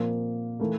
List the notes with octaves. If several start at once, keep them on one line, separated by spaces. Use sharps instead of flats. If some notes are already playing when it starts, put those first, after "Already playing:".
Already playing: A#2 F3 A#3 C4
E3 A3 A#3 E4 A#4